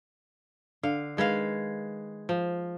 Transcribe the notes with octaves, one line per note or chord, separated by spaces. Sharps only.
D3 F5
D#3 G#3 B4 F5
F3